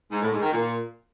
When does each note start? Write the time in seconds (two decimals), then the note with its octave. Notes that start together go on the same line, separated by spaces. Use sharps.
0.11 G#2
0.22 A2
0.32 G#2
0.42 D#3
0.52 A#2